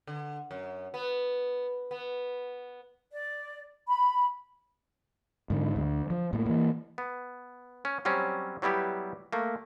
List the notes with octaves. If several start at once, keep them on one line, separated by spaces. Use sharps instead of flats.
D3
F#2
B3
B3
D5
B5
G#2 D3
D2
F3
A2 A#3
E3 A#3
B3
C#4
F#3 G3 C4 C#4
F#3 G3 B3 E4 G4
A3 A#3